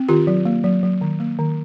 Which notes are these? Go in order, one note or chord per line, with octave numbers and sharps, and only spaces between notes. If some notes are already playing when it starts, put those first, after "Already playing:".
Already playing: C4
D#3 F4 G4
F#3
A#3
F#3
F#3
D#3
A#3
D#3